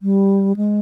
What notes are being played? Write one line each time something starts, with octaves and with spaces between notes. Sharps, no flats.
G3
G#3